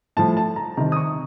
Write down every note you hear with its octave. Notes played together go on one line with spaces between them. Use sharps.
A2 F3 A5
A5
A#5
C3 D#3 A#5
D#6
C#6